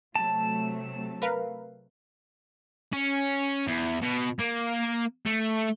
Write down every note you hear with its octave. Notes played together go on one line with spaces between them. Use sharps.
C3 F#3 A3 A5
A#4 B4 F5
C#4
E2
B2
A#3
A3